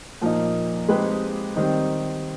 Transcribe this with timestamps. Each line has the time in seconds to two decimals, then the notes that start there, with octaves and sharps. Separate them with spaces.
0.21 A#2 F3 A#3 D#4
0.89 G#3 C4 D#4 G4 B4
1.56 D#3 G3 C4 D#4